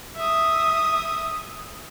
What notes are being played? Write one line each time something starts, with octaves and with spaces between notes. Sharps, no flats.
E5 D#6